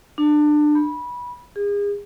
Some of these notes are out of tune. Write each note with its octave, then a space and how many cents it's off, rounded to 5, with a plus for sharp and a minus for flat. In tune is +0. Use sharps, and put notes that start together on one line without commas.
D4 +25
B5 -20
G#4 -35